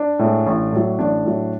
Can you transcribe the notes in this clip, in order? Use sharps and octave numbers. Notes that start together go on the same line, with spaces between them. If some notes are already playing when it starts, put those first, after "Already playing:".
Already playing: D4
A2 G#3
A1
A2 F#3
A1 D4
A2 F#3